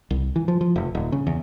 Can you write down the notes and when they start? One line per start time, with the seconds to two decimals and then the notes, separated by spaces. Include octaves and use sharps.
0.10 C2
0.36 E3
0.48 F3
0.61 F3
0.76 F1
0.95 D#1
1.12 C#3
1.27 E2